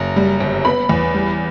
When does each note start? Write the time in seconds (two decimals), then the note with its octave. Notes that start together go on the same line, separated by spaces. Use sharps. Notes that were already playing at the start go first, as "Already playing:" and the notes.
Already playing: F#1 A#5
0.16 G3
0.40 G1
0.65 B3 B5
0.89 E2
1.14 G3